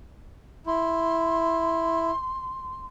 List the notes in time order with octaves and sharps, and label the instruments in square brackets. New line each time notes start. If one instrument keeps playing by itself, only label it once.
[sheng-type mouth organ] E4 [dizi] C6